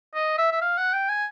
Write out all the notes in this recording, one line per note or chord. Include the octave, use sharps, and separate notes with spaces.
D#5
E5
E5
F5
F#5
G5
G#5